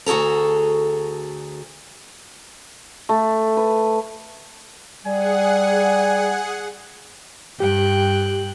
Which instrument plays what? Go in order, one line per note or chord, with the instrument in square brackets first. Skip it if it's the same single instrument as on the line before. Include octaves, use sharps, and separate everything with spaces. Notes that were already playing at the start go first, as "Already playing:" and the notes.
[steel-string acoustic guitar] D2 F#4 G#4 A4 A#5
[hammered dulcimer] A3
B4
[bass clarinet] G3 [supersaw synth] G#4 F#5 [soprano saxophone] G#5
[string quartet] G2 G5 F#6 [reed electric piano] G4